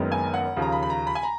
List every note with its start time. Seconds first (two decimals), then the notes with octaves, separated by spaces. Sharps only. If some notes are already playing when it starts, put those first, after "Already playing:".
Already playing: F#1 F#2 D#3 G#3 B3
0.12 G#5
0.34 F#5
0.56 D#2 C#3 F3
0.62 A#5
0.72 B5
0.82 B5
0.90 A#5
1.07 B5
1.15 G#5
1.23 A#5